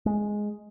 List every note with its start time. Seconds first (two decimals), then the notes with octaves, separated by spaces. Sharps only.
0.06 G#3